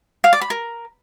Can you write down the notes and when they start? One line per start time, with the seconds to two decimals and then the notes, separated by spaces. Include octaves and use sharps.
0.24 F5
0.33 D5
0.41 B5
0.50 A#4